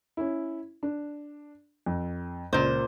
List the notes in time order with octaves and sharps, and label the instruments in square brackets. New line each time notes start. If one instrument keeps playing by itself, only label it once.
[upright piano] C#4 E4
D4
F2
[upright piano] C#2 [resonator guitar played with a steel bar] A#2 C5